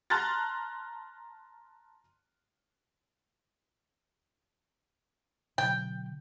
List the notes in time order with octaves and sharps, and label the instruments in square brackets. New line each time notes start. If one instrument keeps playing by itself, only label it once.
[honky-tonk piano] A5 A#5 C6 F6 F#6 A6
[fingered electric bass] B2 D3 F#3 [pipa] G5